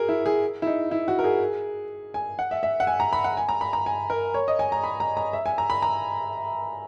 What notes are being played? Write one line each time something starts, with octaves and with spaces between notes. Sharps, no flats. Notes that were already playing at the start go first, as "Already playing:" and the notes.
Already playing: F#4 G#4 A#4
E4
G#4
E4
D#4
E4
F#4
A#4
G#4
G#5
F#5
E5
E5
F#5
G#5
A#5
B5
F#5
G#5
A#5
B5
A#5
G#5
A#4
C#5
D#5
G#5
A#5
B5
A#5
A#5
E5
G#5
A#5
B5
A#5